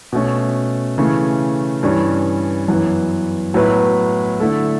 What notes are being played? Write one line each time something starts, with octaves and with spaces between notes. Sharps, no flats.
B2 A3 C#4
C#3 E3 A3 C#4
G2 E3 G3 C#4
F#2 E3 B3
A2 F#3 B3 E4 B4
D3 A3 E4 A4